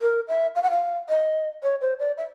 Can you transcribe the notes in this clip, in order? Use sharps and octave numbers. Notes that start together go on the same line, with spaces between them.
A#4
E5
F5
F#5
F5
D#5
C#5
C5
D5
E5